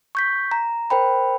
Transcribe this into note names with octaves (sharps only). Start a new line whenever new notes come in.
C#6 G6 B6
A#5
A#4 C5 G5 B5